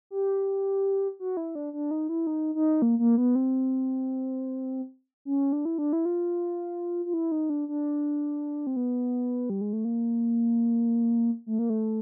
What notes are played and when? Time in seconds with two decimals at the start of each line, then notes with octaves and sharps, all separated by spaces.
0.10 G4
1.20 F#4
1.37 E4
1.55 D4
1.73 D4
1.91 D#4
2.09 E4
2.27 D#4
2.55 D#4
2.82 A#3
2.99 A#3
3.18 B3
3.35 C4
5.25 C#4
5.52 D4
5.65 E4
5.78 D4
5.93 E4
6.05 F4
7.06 F4
7.14 E4
7.32 D#4
7.50 D4
7.69 D4
8.67 C4
8.76 B3
9.50 G3
9.61 G#3
9.73 A3
9.85 A#3
11.46 A3
11.59 A#3
11.70 A3